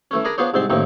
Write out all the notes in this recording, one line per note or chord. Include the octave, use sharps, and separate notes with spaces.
E3 A3 C#4
D4 G#4 A#4 G#5 A#5 B5
B3 D4 F4 G#4 C5 C#5
C2 G#2 C4 A5 C6
A1 A2 D#3 A#3 C4